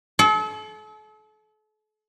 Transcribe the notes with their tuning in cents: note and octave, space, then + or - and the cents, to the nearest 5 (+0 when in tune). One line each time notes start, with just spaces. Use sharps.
A4 -40